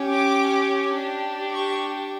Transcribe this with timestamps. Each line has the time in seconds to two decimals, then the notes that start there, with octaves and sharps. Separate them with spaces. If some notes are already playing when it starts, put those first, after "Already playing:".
Already playing: C#4 G4
0.12 D6
0.97 D4 G4
1.54 C#6